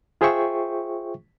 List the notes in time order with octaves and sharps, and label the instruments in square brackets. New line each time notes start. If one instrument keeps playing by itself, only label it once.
[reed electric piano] F4 G#4 C5 E5 G5 C#6